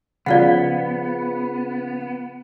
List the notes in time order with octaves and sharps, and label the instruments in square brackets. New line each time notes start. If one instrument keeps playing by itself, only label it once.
[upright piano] C#3 F3 [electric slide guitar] B3 [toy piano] D5 F5 F#5